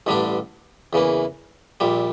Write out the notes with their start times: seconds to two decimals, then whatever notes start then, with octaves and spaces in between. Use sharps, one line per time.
0.06 A1 G2 D3 G3 D4
0.93 E2 C#3 E3 A#3
1.80 A#1 A#2 G3